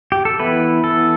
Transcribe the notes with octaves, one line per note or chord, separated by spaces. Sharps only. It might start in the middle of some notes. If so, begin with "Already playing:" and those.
G4
A4
E3 B3 E4 B4
A4